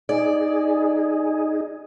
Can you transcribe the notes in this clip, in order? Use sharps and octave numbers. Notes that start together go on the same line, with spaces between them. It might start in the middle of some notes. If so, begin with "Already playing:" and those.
D#4 G#4 D5